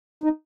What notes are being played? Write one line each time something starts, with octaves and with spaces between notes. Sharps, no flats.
D#4